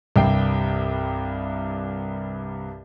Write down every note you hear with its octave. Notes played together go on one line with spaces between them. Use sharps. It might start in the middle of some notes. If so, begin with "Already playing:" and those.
C2 G2 G5 C7